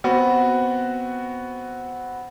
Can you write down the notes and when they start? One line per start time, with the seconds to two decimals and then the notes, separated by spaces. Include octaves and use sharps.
0.04 B3 C4 F#4